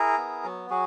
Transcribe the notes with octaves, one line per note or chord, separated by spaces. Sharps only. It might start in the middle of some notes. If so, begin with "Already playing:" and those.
Already playing: E4 G#4 A#4
B3
F#3
F#3 F#4 G#4